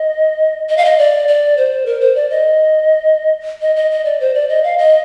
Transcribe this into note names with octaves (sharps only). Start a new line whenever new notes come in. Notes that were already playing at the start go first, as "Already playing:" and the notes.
Already playing: D#5
D#5
F5
D#5
D5
D5
C5
A#4
C5
D5
D#5
D#5
D#5
D#5
D5
C5
D5
D#5
F5
D#5